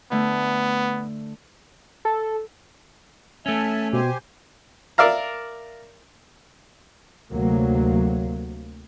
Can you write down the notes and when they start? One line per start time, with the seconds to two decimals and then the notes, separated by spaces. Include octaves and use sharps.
0.11 D3 A3 B3
2.05 A4
3.46 A3 C#4 E5 G#5 A5
3.93 B2 G4 C5 G#5
4.98 A#4 D5 E5 F5 A#5
7.30 D2 C3 F#3 A#3